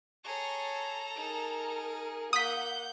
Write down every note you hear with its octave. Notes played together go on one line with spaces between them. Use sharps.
G#4 A4 C#5 A#5
D#4 G#4 A#4
A#3 F#5 D#6 G6 B6